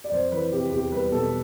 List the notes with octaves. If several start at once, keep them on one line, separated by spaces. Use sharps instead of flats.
D5
F2 C5
E3 B4
C3 G4
E2 G4
G3 B4
B2 A4